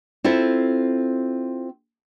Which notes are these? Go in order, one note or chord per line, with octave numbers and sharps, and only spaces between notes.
C4 E4 F4 A4 C5